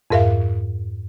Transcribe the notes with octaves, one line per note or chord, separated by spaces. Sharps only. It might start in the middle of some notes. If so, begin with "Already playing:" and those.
F2 G#2 A#4 E5 F5